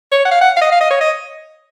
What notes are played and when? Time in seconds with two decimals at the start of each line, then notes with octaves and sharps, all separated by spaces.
0.12 C#5
0.25 F#5
0.31 F5
0.41 F#5
0.57 F5
0.61 D#5
0.72 F5
0.81 D#5
0.90 C#5
1.01 D#5